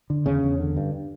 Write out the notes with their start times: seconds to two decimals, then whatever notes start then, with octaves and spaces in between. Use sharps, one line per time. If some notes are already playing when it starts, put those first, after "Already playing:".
0.10 D3
0.26 E2 C#3 C#4
0.44 E2
0.59 D3
0.77 G2